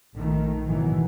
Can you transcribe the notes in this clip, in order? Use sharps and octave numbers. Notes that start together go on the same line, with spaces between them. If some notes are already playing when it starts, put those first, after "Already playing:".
A#1 D#3 A3
G#2 B2 D#3 E3 F#3